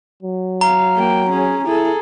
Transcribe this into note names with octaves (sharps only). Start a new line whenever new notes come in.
F#3
F5 A#5
A#3 G5
C#4 G#4
E4 G#4 A4